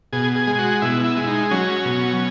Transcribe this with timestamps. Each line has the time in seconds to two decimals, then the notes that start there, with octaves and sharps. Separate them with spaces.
0.13 B2 G#4
0.35 G#4
0.47 G#3
0.58 F#4
0.82 B2 E4
1.04 E4
1.17 G#3
1.27 D#4
1.51 F#3 C#4
1.85 B2